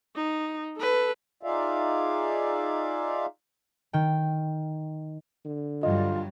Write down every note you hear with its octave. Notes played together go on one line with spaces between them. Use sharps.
D#4
A4 B4
D#4 F4 G#4 D5 E5 F5
D#3 G5
D3
G2 F#3 G3 F4 D#5